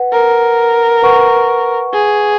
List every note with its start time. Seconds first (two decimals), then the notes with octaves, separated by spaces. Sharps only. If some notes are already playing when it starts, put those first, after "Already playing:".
Already playing: B4 F#5
0.12 A#4
1.03 B4 F#5 C#6
1.93 G#4